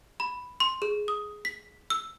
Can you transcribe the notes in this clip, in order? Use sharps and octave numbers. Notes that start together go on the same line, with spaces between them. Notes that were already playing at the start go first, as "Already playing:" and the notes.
B5
C6
G#4
D#6
B6
E6